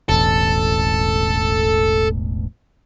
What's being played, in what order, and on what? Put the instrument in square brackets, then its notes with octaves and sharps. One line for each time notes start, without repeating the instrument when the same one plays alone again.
[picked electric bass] E1 A1 [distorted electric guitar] A4